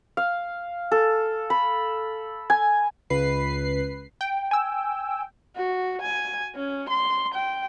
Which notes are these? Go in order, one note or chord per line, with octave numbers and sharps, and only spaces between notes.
F5
A4
B5
G#5
C#2 B4 C7
G5
G#5 E6
F#4
G#5
C#4
C6
G5